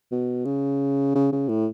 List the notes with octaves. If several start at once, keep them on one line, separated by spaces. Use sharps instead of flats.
B2
C#3
C#3
C#3
A2